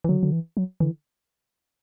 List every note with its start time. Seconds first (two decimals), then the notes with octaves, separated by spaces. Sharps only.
0.05 E3
0.09 D3 F#3
0.23 D3
0.32 E3
0.57 F#3
0.80 D3 E3